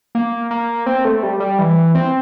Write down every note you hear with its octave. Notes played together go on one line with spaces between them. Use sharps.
A#3
A#3
C4
A3
G3
G3
E3
C4